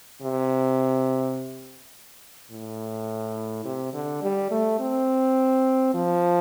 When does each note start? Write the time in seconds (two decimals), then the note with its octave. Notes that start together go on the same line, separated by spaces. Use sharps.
0.22 C3
2.51 A2
3.65 C3
3.93 D3
4.22 G3
4.51 A3
4.79 C4
5.94 F3